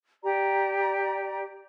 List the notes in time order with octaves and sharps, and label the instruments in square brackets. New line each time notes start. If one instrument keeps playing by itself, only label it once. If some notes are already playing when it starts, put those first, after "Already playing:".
[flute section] G4 D5 A#5